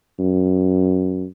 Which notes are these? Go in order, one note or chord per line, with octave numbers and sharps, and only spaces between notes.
F#2